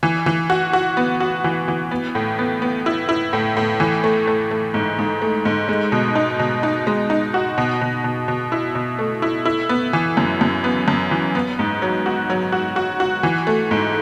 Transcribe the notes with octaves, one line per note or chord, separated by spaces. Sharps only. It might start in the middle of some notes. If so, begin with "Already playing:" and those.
E3
E3
F#4
F#4
B3
F#4
E3
E3
B3
A2
B3
B3
E4
E4
A2
A2
E3
A3
A3
A3
G#2
G#2
A3
G#2
G#3
B2
D#4
B2
D#4
G#3
D#4
F#4
B2
B2
B2
B2
E4
B2
A3
E4
E4
B3
E3
F#2
F#2
B3
F#2
E3
B3
G#2
F#3
F#4
F#3
F#4
F#4
F#4
E3
A3
G#2